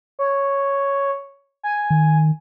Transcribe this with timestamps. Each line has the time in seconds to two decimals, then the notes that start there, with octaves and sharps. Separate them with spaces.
0.19 C#5
1.63 G#5
1.90 D#3